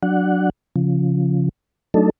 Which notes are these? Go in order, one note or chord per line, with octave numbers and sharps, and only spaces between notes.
F#3 D4 F#5
C#3 F3
F#3 A3 D4 D#4 A4